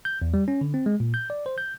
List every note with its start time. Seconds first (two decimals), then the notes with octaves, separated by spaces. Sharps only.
0.05 G6
0.22 E2
0.34 G3
0.48 C#4
0.61 D3
0.74 C4
0.86 G#3
1.00 A#2
1.14 G6
1.30 D5
1.46 C5
1.58 G6